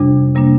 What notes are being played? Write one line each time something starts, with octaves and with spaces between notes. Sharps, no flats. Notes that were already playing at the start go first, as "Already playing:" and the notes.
Already playing: F2 C3 G3 D4
C3 G3 A#3 D4